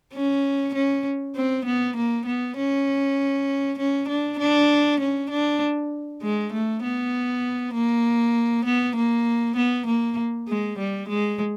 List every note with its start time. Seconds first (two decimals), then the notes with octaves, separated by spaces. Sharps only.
0.13 C#4
0.74 C#4
1.36 C4
1.65 B3
1.96 A#3
2.26 B3
2.57 C#4
3.79 C#4
4.08 D4
4.39 D4
5.00 C#4
5.30 D4
6.22 G#3
6.53 A3
6.83 B3
7.74 A#3
8.65 B3
8.96 A#3
9.56 B3
9.87 A#3
10.48 G#3
10.79 G3
11.09 G#3